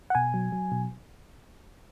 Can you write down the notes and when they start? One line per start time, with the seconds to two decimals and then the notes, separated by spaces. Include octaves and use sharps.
0.10 F#5
0.15 B2 G#5
0.34 F#3
0.52 F#3
0.72 B2